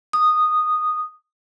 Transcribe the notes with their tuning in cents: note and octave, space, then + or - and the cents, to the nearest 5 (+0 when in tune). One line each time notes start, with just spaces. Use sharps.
D#6 -10